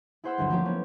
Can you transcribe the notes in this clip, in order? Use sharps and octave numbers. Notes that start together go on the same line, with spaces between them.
E4 G#4 C5 F#5 C6 E6
G1 D2 F#3
F3 A3 A#3 C4 C#4 G4
B3 C#4